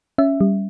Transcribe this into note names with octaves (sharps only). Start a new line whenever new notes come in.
C#4 E5
G3